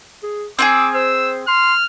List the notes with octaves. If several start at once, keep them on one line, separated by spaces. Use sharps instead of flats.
G#4
C4 F4 G#4 D6 E6
C5 E6
C6 F6